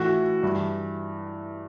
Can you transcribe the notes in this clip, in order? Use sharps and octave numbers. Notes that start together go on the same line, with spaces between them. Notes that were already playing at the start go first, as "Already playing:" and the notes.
Already playing: A2 E3 F#4
G2 E3